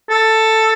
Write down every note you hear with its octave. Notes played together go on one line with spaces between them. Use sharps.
A4